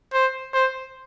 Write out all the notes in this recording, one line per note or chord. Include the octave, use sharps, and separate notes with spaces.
C5
C5